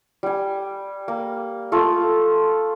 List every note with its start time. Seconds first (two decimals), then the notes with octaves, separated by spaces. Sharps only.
0.23 G3 G#5
1.08 A#3
1.72 A3 F4 A4 D#6